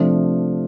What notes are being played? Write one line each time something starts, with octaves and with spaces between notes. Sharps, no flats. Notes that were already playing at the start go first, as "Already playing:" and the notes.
Already playing: C3 F3 A3 D4